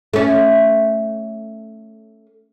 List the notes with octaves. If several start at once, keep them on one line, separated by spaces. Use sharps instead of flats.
A3 C#4